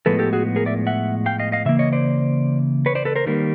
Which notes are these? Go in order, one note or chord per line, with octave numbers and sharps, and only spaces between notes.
A2 F3 G#3 B3 A4 B4
G4 A4
F#4 G#4
G#4 A#4
D5 E5
E5 F#5
F5 G5
D#5 F5
D#5 F5
C#3 E3 A#3 E5
C#5 D#5
C5 D5
B4 C#5
C5 D5
A4 B4
A#4 C5
D#3 G3 A#3